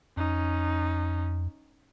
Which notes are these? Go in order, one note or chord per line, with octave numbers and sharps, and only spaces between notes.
F2 C#4 D#4